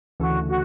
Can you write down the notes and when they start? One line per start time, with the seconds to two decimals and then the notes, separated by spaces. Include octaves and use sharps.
0.19 D2 C#3 E3 A3 F#4
0.48 F#4